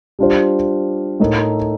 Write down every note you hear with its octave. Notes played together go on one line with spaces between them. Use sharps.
G3 D4 F4 C5
A2 A3 D#4 A#4